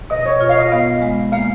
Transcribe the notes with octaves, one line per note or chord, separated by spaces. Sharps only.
B2 D#5
C#5
F4 C#5
F5
D#5
B3 F5
G#3
A#3 F5